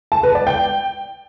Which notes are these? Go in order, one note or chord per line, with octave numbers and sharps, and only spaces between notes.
A5
B4
D5
G5